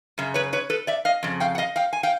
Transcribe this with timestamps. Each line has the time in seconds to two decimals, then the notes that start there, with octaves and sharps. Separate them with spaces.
0.18 F#2 C#3
0.34 B4 C#5
0.53 B4 C#5
0.70 A4 B4
0.87 D5 E5
1.05 D#5 F5
1.23 F2 C#3
1.40 F5 G5
1.55 F#5
1.58 D#5 F5
1.76 F5 G5
1.93 G#5
2.03 F5 G5